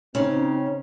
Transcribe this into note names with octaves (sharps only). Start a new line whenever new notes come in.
C#3 C4 C#4 D#4